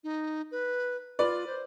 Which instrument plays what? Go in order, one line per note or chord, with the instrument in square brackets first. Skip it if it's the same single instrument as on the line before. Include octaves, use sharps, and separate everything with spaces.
[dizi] D#4
B4
[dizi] F4 [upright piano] B4 D5
[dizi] C5